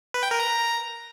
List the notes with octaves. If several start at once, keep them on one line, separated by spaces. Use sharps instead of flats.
B4
G5
A#4
A#5